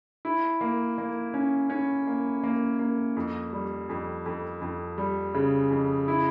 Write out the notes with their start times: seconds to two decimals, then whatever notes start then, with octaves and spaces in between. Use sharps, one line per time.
0.25 E4
0.61 A#3
0.98 A#3
1.34 C#4
1.70 C#4
2.07 A#3
2.43 A#3
2.79 A#3
3.17 F2
3.53 G3
3.89 F2
4.26 F2
4.62 F2
4.98 G3
5.34 C#3
5.71 F2
6.08 E4